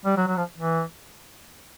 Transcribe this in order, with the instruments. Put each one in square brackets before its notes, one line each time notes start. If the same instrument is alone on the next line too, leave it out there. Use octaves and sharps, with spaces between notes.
[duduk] G3
F#3
F#3
F3
E3